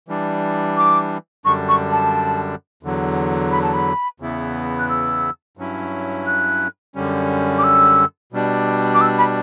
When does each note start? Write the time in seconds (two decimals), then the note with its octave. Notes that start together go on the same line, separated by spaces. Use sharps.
0.08 E3 G3 D4
0.77 D6
1.45 F#2 D3 G3 D4 C#6
1.68 C#6
1.92 A5
2.83 E2 D3 F#3
3.51 B5
3.62 A5
3.73 B5
4.20 E2 C#3 E3 B3 E4
4.79 F#6
4.89 E6
5.57 G2 F#3 C#4 E4
6.26 F#6
6.95 F#2 D3 G3 C#4
7.58 D6
7.64 E6
8.32 B2 G3 D4
8.94 D6
9.01 E6
9.18 B5